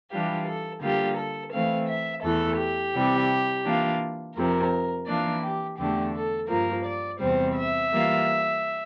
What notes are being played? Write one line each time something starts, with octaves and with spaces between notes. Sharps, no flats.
E3 G3 D4 F4 G4
A4
D3 G3 A#3 F4 G4
A4
E3 A3 C4 F5
E5
E2 E3 A3 A4
G4
C3 E3 G3
E3 A#3 D4 F4
F2 C3 F3 A#4
E3 A#3 D4 F4 D5
G4
E2 D3 A3 D4 G4
A4
G2 F3 A#3 A#4
D5
E2 C3 G3 C4 C5
E5
E3 G3 A#3 F4